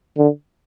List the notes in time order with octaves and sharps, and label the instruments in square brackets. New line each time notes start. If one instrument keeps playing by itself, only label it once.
[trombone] D3